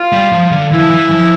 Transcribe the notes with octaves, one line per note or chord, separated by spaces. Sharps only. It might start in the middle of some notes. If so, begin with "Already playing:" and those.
Already playing: F4
G3
F3
D3
E3 E4
F3
E3
F3